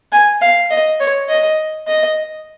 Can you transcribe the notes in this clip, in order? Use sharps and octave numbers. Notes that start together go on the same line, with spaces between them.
G#5
F5
D#5
C#5
D#5
D#5